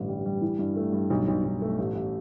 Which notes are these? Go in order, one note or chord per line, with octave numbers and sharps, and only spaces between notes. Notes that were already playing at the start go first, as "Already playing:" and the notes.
Already playing: A1 G2 D3
G3
G3
E3
G2
A3
G2
B1
B1
B1
A3
A1
A1